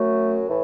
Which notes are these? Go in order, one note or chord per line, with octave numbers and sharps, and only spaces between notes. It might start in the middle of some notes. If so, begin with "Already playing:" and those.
Already playing: F#2 F#3 A3
A2 E3